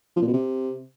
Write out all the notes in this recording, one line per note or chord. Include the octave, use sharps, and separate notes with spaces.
F3
A#2
B2
C3